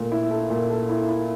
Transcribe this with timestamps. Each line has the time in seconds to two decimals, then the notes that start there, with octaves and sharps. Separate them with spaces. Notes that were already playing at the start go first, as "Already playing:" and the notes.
Already playing: A#2 A3
0.12 E4
0.31 A4
0.50 A#2
0.70 A4
0.89 E4
1.08 E4